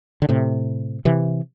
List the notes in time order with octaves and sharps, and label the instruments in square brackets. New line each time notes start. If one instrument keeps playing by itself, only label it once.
[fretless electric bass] D3
A2 C3
C3 E3